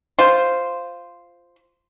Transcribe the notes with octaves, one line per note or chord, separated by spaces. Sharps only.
F4 C5